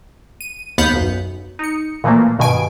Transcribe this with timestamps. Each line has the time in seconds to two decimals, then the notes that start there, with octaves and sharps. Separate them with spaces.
0.41 D#7
0.78 D#2 B3 F5 F#5 G6 B6
0.93 B1 F#2
1.59 D#4 C#7
2.04 A#2 E3 F3 A3 A#3
2.39 G2 B2 D#3 G#5 D7